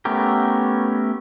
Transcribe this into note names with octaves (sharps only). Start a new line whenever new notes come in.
A3 B3 C#4 G4 A#4